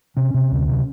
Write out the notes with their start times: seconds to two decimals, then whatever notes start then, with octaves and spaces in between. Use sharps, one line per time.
0.17 C3 C#4
0.34 C3
0.52 D2
0.69 C3